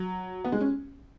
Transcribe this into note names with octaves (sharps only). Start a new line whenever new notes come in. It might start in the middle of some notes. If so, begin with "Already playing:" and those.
Already playing: F#3
B3
G#3
C#4